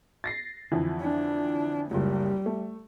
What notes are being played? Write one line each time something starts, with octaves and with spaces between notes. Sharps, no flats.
A6 A#6 C7
F2 D3 E3
D4
F#1 C#2 G3
A3